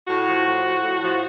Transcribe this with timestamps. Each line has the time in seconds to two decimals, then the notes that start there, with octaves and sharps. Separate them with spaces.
0.08 A2 F#4
0.27 F3
0.46 F3
0.64 A2
0.83 A2
1.03 F3